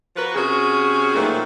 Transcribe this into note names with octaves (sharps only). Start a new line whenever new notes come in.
F3 F#4 A#4 B4
C3 C#4 F#4 G#4
A#2 D#3 F3 F#3 G#3 A3